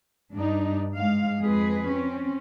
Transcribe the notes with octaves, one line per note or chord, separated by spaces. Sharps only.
G2 D4 D#4
G#2 G#3 F5
F2 G#3 G#4 B4
C4 C#4